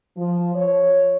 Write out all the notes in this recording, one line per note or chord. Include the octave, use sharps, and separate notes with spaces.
F3
C#5